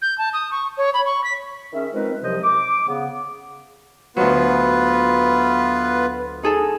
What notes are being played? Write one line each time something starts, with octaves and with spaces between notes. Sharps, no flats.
G6
A5
D#6
C#6
C#5
B5
C#6
B6
D#3 C#4 G#4 E5
F3 G#3 C4 D#4 A#4 B4
C2 C3 F3 F#3 C5 D#5
D6
C#3 B3
D2 F#3 B3 F4 B4
D#4 G#4 A4